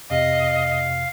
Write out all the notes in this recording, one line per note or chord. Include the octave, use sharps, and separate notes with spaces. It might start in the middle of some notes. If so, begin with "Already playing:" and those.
F2 C3 D#5 F5